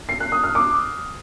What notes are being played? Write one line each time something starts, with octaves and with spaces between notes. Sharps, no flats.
C7
F#6
D#6
F6
D6